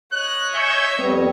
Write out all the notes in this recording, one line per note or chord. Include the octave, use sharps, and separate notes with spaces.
C#5 D#5 F#6
E5 G#5 C#6 G6
F2 G3 B3 C4